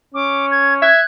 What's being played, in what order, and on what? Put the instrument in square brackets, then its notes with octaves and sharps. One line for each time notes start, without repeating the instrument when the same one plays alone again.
[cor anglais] C#4 [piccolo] D6
[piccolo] G#6
[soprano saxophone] E5 [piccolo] F#6 [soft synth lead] G#6